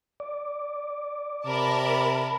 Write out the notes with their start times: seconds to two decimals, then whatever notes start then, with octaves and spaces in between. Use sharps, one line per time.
0.20 D5
1.46 C3 A#4 A5 B5